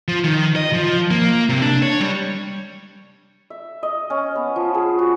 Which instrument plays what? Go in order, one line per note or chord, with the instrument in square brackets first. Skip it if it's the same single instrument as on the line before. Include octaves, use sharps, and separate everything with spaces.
[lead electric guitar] F3
D#3
D#5
F3
A#3
C3
D4
C#5
G3
[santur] E5
D#5
C#4
B3
F3
G#4
F#4